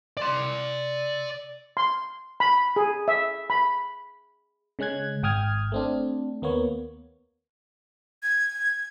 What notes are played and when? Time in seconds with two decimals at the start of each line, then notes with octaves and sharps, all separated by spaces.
0.17 D5 C6
1.77 C6
2.40 B5
2.76 G#4
3.08 E5
3.50 B5
4.79 C#3 G#3 C#4 F#6 G#6
5.23 G#1 G5 D#6 F6 G#6
5.72 A3 C4 D4
6.42 D#2 A#3 B3 C#5
8.23 G#6